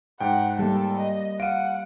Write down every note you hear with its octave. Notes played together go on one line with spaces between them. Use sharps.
G#2 F#5 G5
G3 A#3 A4
D#5
F5 F#5 D7 D#7